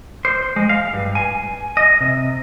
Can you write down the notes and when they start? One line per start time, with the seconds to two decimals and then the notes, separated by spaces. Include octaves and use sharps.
0.25 C5
0.56 G#3
0.69 F5
0.93 G2
1.15 G#5
1.77 D#5
2.01 C3